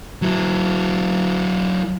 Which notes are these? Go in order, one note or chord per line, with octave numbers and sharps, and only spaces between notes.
F#3 E4